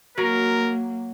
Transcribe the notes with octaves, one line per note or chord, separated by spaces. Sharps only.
F#3 A#3 A#4